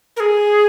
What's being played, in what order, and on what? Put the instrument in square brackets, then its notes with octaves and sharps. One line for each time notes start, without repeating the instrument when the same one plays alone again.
[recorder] A#4
G#4